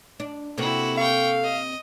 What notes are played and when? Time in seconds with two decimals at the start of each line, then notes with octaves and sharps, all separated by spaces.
0.20 D4
0.58 C3 A#3 C4 E4 F#4 A4
0.97 F5 G5 C#6
1.44 D#5